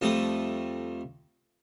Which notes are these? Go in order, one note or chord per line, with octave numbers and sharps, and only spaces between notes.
F2 G3 A3 D#6